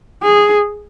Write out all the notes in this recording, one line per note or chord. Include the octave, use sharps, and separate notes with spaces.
G#4